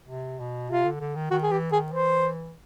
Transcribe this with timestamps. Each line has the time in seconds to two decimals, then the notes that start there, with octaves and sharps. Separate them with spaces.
0.08 C3
0.39 B2
0.70 C3 F4
0.85 D3
1.00 D3
1.15 D#3
1.31 D#3 F#4
1.43 G#4
1.51 E3 G4
1.72 D#3 G#4
1.92 E3 C5